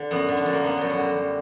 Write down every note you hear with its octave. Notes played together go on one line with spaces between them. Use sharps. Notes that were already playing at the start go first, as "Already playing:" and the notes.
Already playing: D3
F#2 B3
D3
D4
F#2
A#3
D3 B3
F#2 F#3
F#3
D3 G3
F#2